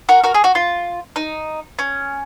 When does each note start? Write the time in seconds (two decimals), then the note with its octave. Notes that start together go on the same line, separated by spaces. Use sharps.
0.09 F#4 A#4
0.24 F#4 A#4
0.34 G#4
0.44 F#4
0.55 F4
1.16 D#4
1.79 C#4